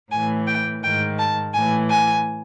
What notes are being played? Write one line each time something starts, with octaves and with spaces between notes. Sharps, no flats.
A2 E3 G#5
G5
G#2 D#3 G5
A5
A2 E3 G#5
G#5